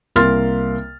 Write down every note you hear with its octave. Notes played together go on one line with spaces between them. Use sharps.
C2 A#3 A#4 C6 F6 A6